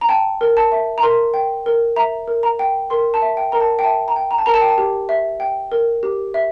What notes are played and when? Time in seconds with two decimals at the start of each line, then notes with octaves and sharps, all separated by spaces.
0.01 A#5
0.09 G5 A5
0.41 A#4
0.57 A5
0.72 E5
0.98 A#5
1.02 A#4 C6
1.34 G5
1.66 A#4
1.96 E5 A#5
2.28 A#4
2.43 A#5
2.59 G5
2.90 A#4 C6
3.14 A5
3.22 E5
3.37 G5
3.52 A#4 A#5
3.61 A5
3.79 G5
3.84 E5 A5
4.08 A#5
4.16 G5
4.31 A#5
4.38 A5
4.46 A#4 A#5
4.54 A5
4.61 G5
4.69 A5
4.78 G4
5.09 E5
5.40 G5
5.72 A#4
6.03 G4
6.34 E5